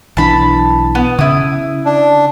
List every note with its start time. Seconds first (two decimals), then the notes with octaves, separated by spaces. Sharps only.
0.17 B1 E3 D4 A5 B5
0.95 B3
1.19 C#3 E4 D#6
1.85 D4